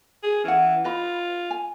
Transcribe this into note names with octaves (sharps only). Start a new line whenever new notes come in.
G#4
E3 C#4 F#5
F4 B4 D#5 B5
G#5